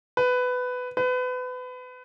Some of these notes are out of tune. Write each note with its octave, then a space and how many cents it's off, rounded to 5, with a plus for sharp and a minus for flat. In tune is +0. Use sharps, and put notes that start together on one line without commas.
B4 +15
B4 +30